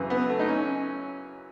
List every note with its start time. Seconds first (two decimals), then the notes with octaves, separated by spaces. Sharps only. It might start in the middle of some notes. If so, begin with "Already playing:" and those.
Already playing: F#2 C#3 E3
0.10 B3
0.30 A3
0.40 D#4
0.48 C#4